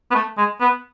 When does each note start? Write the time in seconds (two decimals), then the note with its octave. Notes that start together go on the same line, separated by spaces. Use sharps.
0.11 B3
0.15 A3
0.38 G#3
0.61 B3